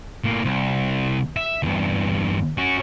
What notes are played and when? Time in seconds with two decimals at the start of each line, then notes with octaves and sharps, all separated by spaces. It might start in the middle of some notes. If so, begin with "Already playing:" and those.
0.24 A2 A#3
0.45 C2
1.37 E5
1.63 E2 G2
2.58 C#4 F#4